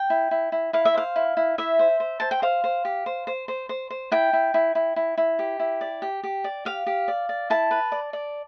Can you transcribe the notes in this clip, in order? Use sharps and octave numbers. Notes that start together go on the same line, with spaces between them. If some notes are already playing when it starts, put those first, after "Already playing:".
Already playing: G5
E4
E4
E4
E4 F5
E5
C5 F5
E4
E4
E4 E5
C5
C5
C5 A5
G5
C5 F5
C5
G4
C5
C5
C5
C5
C5
E4 G5
E4
E4
E4
E4
E4
G4
E4
D5
G4
G4
D5
G4 F5
G4
D5
D5
E4 A5
B4
D5
D5